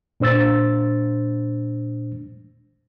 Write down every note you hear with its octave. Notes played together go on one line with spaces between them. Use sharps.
A#2 D4 C5 E6 A6